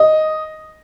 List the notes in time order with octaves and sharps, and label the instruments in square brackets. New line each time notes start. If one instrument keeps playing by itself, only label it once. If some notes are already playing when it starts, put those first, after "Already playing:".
Already playing: [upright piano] D#5